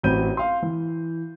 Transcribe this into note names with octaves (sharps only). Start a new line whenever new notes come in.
A1 C4 F#4 B5 G6 D#7
F5 C6
E3